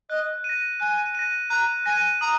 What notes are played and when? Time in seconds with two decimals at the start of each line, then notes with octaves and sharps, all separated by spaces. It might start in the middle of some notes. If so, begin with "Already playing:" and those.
0.10 D#5 F#6
0.44 D#7
0.49 A#6
0.80 G#5 F#6
1.15 A#6 D#7
1.50 A#5 F#6
1.86 G#5 A#6 D#7
2.21 A#5 D#6